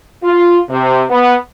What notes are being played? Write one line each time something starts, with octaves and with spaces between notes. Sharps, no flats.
F4
C3
B3